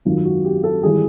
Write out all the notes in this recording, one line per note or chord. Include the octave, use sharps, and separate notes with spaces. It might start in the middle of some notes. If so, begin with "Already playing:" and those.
G#1 F#2 D#3 F4
F#4
G4
A4
G#1 E3 G3 G#4